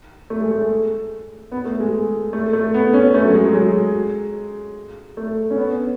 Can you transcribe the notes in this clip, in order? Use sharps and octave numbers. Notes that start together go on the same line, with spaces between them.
A3
G#3
A3
B3
A3
G#3
A3
A3
B3
C#4
A3
F#3
G#3
F#3
G#3
A3
C#4
B3